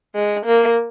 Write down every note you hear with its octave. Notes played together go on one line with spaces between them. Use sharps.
G#3
A#3